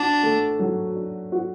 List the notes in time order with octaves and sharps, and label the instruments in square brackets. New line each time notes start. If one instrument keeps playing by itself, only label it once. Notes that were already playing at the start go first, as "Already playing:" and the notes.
Already playing: [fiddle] D4 [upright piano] F#4
[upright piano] A3
F#3
D4
F#4